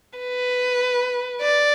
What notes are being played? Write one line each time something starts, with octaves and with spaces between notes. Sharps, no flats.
B4
D5